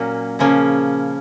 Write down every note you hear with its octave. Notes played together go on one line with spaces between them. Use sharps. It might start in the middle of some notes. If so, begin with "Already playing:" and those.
Already playing: A#2 F#3 A#3 C#4
C#3 F3 A#3 C#4